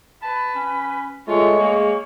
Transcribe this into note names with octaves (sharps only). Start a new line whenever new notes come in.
B4 A5
C#4
G#3 A3 F4 C#5
A#3 G#4